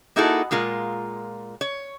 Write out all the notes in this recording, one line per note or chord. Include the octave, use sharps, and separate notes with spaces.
A#3 D#4 E4 F#4 G#4 A4
A#2 G#3 F4 A#4
C#5